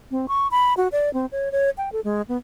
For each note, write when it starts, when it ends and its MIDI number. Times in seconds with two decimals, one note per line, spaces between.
0.11 0.26 60
0.28 0.47 85
0.51 0.74 83
0.77 0.88 66
0.92 1.12 74
1.14 1.26 60
1.32 1.52 73
1.52 1.70 73
1.78 1.92 79
1.92 2.00 69
2.04 2.22 56
2.29 2.37 59